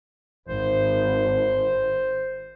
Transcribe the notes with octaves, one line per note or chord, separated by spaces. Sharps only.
G#1 C5